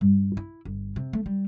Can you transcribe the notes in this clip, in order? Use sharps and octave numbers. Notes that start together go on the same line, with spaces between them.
G2
E4
G1
C3
A3
G3